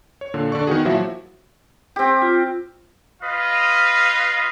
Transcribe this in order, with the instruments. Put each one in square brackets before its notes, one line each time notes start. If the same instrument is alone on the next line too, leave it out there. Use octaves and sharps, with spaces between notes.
[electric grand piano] C#5
A#2 D3
D3 D5 C#6
D#3 B3 F#4 G#4
A#2 F3 F#3 E4 F#4 E5
[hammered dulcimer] C4 G4
[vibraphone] F4
[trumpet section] F4 B4 D#5 F5